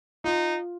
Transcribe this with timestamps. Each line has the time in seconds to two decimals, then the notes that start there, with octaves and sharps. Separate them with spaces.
0.24 D#4 F4